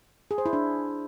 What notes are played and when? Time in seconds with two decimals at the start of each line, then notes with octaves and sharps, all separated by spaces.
0.31 G#4
0.38 C5
0.46 E4
0.53 D4